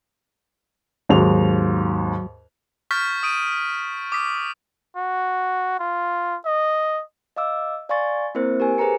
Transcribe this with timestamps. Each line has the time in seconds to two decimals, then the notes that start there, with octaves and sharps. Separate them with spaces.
1.09 D#2 G#2 F#3 F7
2.91 C#6 F6 G6 A6 B6
3.23 D#6 D7 D#7
4.12 D6 D#6 B6
4.97 F#4
5.79 F4
6.45 D#5
7.36 D#5 F5 D6 E6
7.89 D5 F5 G#5 C6 C#6 A6
8.35 A#3 C4 E4 A#4 C5
8.60 G4 A#4 G#5
8.78 G#4 B4 C5 A#5 C#7